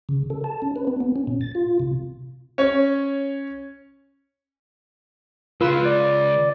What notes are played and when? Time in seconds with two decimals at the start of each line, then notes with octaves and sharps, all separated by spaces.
0.09 C#3
0.30 A4
0.44 A5
0.62 C#4
0.76 B4
0.87 C4
1.00 B3
1.16 C#4
1.27 A#2
1.41 A6
1.55 F4
1.80 C3
2.58 C#4 C#5
5.61 C#3 G#3 F4 B4 E6
5.85 D5